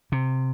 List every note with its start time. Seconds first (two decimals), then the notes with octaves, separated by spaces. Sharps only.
0.12 C3